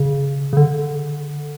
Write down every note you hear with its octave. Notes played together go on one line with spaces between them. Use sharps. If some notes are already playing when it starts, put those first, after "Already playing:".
Already playing: C#3
C#3
D3